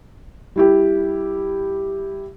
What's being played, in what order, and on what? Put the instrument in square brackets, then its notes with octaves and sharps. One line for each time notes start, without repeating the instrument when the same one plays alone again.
[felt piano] G3 E4 G4